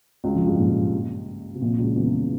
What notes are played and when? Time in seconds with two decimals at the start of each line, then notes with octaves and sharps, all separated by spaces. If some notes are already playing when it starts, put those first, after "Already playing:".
0.24 C#2 C#3
0.35 F2 F3
0.47 G2 G3
0.53 G#2
0.58 A#1 A#2
1.55 C3
1.61 A#1 A#2
1.79 C#2 C#3
1.96 E2 E3